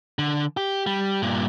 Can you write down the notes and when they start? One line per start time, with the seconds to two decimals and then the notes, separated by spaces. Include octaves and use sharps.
0.19 D3
0.57 G4
0.87 G3
1.22 G2 A#2